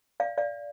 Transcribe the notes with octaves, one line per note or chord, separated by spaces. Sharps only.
D5 F5
D5 F5